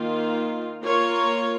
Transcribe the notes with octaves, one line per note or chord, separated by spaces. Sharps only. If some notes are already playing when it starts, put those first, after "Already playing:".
Already playing: D#3 A#3 F4
A#3 F4 A#4 C#5